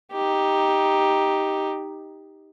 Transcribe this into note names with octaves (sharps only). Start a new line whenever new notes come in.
D#4 G4